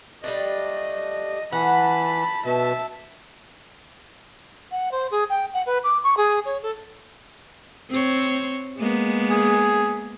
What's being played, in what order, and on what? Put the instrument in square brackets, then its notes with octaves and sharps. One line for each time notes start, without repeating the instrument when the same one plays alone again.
[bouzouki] G3 A3 D4 [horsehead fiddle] D#5
[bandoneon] E3 [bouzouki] F#5 [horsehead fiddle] A5 B5
[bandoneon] B2 [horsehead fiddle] E5 A5
[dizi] F#5
C5
G#4
G5
F#5
B4
D6
C#6
G#4
C#5
A4
[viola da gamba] C4 C5 C#5
G#3 A#3 B3
[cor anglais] G#4